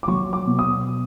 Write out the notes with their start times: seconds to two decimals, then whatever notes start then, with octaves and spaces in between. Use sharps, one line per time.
0.03 D6
0.08 F#3 C#6
0.33 D6
0.47 B2
0.59 D#6